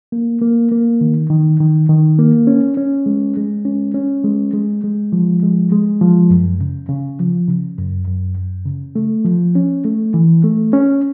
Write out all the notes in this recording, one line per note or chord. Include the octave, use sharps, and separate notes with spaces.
A#3
A#3
A#3
D#3
D#3
D#3
D#3
A#3
C#4
C#4
G#3
G#3
C#4
C#4
G#3
G#3
G#3
F3
G#3
G#3
F3
F#2
C#3
C#3
F3
C#3
F#2
F#2
F#2
C#3
A3
F3
C#4
A3
E3
A3
C#4